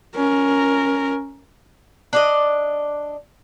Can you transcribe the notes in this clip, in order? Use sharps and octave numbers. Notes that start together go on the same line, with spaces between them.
C#4 A#4
D4 D5 D#5